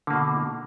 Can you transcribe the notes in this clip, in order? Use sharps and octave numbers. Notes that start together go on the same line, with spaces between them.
B2 D3 A#3